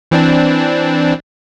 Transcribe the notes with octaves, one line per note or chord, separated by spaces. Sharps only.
E3 C4 D4